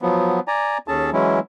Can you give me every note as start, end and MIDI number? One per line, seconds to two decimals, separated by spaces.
0.02 0.40 53
0.02 0.40 54
0.02 0.40 59
0.48 0.78 74
0.48 0.78 80
0.48 0.78 82
0.88 1.10 39
0.88 1.10 61
0.88 1.10 68
0.88 1.10 69
0.88 1.10 81
1.13 1.40 52
1.13 1.40 54
1.13 1.40 56
1.13 1.40 61
1.13 1.40 64